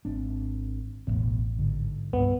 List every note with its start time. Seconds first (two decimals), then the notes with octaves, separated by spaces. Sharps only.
0.05 G#1 C4 D4
1.07 E1 A1 D#2 B3
1.59 G#2 D3
2.13 C2 G2 B3